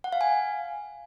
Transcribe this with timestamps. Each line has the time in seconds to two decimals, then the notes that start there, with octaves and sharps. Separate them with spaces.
0.04 F#5
0.12 F5
0.21 G#5